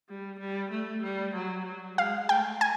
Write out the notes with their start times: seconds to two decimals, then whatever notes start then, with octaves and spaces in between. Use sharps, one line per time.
0.09 G3
0.40 G3
0.71 A3
1.03 G3
1.35 F#3
1.66 F#3
1.98 G#3 F5
2.29 A3 G5
2.61 G#5